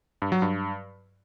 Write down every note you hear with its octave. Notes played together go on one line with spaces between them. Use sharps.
G2
F#3
G2